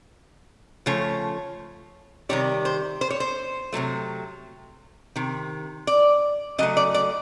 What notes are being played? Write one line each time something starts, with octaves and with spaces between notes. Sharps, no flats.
C#3 F3 A3 C#5
C3 D#3 G3 C#5
C5
C5
C#5
C5
C3 D#3 F#3 A3
C3 D#3
D5
C#3 F#3 A3 D#5
D5
D5